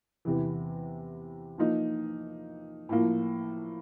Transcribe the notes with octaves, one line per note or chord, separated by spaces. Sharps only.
E2 C3 E3
F3 A#3 D#4
A2 F3 A#3